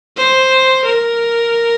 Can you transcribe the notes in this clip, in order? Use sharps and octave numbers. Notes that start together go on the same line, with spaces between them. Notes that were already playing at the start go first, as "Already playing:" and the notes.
C5
A#4